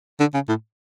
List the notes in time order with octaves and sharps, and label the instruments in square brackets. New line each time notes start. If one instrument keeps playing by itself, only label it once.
[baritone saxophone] D3
C#3
A2